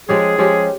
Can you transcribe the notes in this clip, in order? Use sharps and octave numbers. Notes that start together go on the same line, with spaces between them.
F3 G#3 C#4 G4 G#4
F3 G#3 C#4 G4